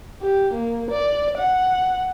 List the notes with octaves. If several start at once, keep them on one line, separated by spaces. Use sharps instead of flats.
G4
A#3
D5
F#5